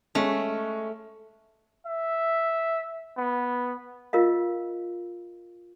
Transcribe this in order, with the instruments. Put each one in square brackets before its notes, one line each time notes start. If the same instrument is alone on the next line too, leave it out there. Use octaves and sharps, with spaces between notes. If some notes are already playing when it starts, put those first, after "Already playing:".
[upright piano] G#3 C#4 [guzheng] A3
[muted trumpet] E5
B3
[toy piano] F4 A#4 D#5 F5